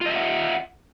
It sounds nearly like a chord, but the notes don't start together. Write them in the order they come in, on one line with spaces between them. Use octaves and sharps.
F4 D#5 E5 F#5